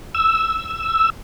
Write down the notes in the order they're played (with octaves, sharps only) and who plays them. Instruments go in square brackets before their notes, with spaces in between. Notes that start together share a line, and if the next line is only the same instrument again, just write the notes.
[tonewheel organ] E6